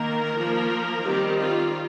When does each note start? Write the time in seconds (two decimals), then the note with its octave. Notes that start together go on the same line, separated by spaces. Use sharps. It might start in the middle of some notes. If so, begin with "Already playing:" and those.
Already playing: D#3 A#3 A#4
0.36 F3 A#3
1.05 D#3 G3 C4 G4
1.38 F4